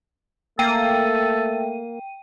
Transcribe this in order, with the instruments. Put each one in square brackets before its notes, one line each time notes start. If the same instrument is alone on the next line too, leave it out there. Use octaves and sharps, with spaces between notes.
[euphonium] A3 [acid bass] A#3 [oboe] A4 [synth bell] G5 D#7